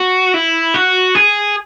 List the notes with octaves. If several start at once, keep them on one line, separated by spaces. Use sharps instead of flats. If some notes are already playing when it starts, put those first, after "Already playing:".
Already playing: F#4
E4
F#4
G#4